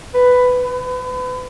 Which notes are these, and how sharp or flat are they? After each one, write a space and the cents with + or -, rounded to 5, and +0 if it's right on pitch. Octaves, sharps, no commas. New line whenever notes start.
B4 +10
B4 +35